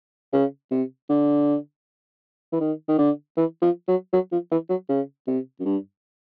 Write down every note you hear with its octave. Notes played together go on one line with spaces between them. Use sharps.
C#3
C3
D3
E3
D#3
D#3
D3
E3
F3
F#3
F#3
F3
E3
F#3
C#3
C3
F#2
G2